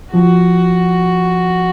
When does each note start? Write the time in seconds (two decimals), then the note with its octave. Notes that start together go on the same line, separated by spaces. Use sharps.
0.14 F3 F#4